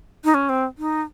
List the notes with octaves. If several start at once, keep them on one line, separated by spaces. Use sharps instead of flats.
D#4
C#4
C4
D#4